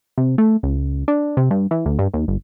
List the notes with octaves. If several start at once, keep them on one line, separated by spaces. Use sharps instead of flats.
C3
A3
C#2
D4
C3
G2
E3
D2
G2
D#2
G1